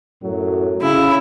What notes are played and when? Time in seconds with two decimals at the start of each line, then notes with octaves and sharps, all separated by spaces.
0.23 F#2 A2 F#3
0.81 C#3 E4